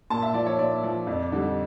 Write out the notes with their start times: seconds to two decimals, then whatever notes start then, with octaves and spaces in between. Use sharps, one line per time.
0.10 A#2 A5
0.23 E5
0.34 F3 D5
0.46 C#5
0.59 A#2 D5
0.84 F3
1.07 F2
1.32 D3 G3